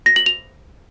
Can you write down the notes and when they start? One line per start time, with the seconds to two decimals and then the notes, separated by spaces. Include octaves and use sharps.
0.06 A#6
0.16 F#7
0.26 F7